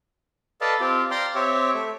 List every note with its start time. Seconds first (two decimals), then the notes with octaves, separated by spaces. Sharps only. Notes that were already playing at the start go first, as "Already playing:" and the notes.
0.61 A4 B4 D5 D#5 F5 A5
0.80 C4 F4 G4
1.11 D5 F5 G5 A#5 C6
1.35 C4 G4 C#5 E5
1.74 A3 E5